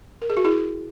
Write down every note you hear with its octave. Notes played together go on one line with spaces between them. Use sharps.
A#4
G#4
F#4
E4 G#4